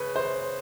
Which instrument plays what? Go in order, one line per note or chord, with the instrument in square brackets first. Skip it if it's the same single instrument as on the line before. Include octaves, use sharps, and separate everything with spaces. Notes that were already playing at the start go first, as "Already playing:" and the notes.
Already playing: [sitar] C#3 [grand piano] B4
[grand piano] C5